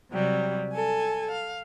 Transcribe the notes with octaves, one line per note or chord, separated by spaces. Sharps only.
C3 F#3 G3
A4 G#5
F5